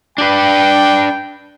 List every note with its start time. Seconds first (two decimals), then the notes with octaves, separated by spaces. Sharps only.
0.18 D4 B4 G5